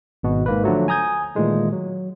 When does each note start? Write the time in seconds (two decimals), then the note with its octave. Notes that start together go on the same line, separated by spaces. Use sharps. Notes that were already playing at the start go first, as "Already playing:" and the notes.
0.23 G#1 B2 F#4
0.46 G#2 A#3 B4
0.64 D3 F3 F#3 A3
0.88 G#5 A#5 D#6 G6 G#6
1.35 A#2 D#3 E3 G#3 A3
1.73 F#3